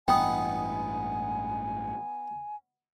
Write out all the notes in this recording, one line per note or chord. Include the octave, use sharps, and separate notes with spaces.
A1 G2 E3 B3 D#4 G5 G#5 D#6